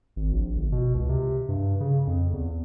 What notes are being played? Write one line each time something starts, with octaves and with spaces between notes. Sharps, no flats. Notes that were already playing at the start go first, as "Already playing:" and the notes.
G#1
A#1
G1
B2
C#2
C3
G2
C#3
F2
E2